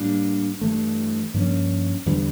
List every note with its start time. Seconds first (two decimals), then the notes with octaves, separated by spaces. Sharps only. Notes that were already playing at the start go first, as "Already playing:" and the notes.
Already playing: A2 G3 A#3 D4
0.61 G2 E3 A3
1.34 G2 F3 A#3 C#4
2.06 E2 D3 G3 D4